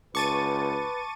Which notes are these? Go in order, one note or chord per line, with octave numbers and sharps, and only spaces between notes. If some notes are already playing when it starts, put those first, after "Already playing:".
C#2 B4 A5 C#6 D6 A6 D#7